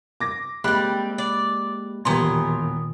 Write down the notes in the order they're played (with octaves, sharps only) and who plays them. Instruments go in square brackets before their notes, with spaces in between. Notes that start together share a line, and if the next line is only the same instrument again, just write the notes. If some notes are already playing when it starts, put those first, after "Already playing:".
[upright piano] D6 A#6
[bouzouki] G3 C4 [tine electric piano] G#3 A#3 G4 [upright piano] B5 F#6
[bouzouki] D5
[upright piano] E1 G4 C6 [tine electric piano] A#2 D#3 [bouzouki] B3 G#5 A#5